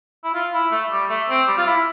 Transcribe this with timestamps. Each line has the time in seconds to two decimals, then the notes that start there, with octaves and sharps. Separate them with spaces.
0.24 E4
0.34 F4
0.53 E4
0.72 A3
0.91 G3
1.09 A3
1.29 C4
1.48 G3
1.58 F4
1.67 E4